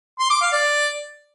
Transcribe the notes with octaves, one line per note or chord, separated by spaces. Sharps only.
C6
D6
F5
D5